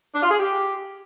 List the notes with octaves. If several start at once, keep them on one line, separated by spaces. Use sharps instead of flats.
D4
F4
G#4
G4